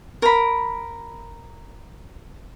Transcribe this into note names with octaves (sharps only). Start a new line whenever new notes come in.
A#4 B5